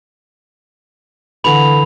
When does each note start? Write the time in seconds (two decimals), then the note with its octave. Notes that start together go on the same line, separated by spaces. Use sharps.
1.44 D3 E3 B5 C#6 F7